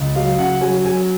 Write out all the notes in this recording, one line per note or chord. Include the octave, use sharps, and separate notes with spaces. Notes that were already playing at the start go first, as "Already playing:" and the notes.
Already playing: C#2
F#3 F5
C#3 F#5
F#3 G#5
F#3 G#5